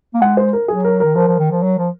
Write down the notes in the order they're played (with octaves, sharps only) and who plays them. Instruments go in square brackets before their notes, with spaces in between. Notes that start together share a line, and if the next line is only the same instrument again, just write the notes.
[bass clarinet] A#3
[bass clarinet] G#3 [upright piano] F#5
[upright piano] C5
A#4
[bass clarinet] F#3 [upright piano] G#4
[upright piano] A#4
[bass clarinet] D#3 [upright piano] A#4
[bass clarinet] F3 [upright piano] A#4
[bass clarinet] F3
D#3
F3
F#3
F3